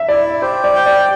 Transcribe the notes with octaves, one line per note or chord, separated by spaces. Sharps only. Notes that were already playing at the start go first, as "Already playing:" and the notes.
Already playing: E5
E4 D5
G4 C5
D5
G5
D5